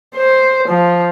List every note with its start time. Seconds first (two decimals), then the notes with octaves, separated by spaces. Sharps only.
0.16 C5
0.69 F3